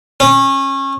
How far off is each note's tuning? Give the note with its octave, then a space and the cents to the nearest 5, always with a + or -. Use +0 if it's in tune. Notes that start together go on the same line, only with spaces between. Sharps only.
C#4 -25